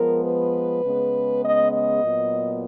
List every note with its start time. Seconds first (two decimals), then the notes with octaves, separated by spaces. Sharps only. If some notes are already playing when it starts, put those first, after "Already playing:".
Already playing: F3 G#3 B3 A#4
0.24 B4
0.83 C#3 G#3 B3
1.42 D#5
1.72 D#5
2.02 A#2 F#3 B3